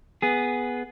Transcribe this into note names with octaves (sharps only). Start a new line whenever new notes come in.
B3 G#4